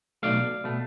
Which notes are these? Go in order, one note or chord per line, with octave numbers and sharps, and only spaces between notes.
B1 B2 A3 D5 F5
B2 A3